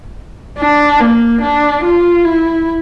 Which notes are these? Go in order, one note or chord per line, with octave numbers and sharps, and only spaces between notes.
D4
A#3
D4
F4
E4